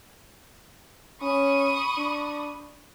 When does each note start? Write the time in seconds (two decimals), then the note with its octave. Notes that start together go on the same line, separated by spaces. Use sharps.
1.22 C#4 B5 C#6 D#6
1.98 D4